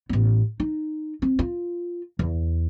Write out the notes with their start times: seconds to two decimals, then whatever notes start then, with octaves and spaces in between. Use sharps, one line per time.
0.09 A1 B3
0.60 D#4
1.22 C4
1.39 F4
2.19 E2